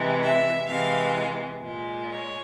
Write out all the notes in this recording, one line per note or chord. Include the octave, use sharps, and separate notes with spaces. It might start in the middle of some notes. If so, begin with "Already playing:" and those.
Already playing: C3 E3 G#3
E5
C3 E3 G#3 F5
A#2 G#3
C#5